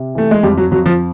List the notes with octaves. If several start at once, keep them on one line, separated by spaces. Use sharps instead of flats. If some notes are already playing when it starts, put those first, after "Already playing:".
Already playing: C3
E3 A3
G#3
F2 G3
F#3
F2 F#3
F3